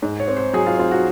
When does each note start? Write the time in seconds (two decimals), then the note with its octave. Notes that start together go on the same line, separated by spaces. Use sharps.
0.02 G#2
0.20 C#5
0.28 C4
0.37 C5
0.53 F#3 G#4
0.66 F4
0.79 C4 F4
0.91 F#4